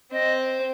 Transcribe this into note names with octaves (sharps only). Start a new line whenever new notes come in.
C4 D#5